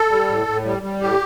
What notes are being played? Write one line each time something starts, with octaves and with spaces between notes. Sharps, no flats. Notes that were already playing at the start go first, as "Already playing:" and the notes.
Already playing: A4
G3
A2
A2
G3
G3
A2 G4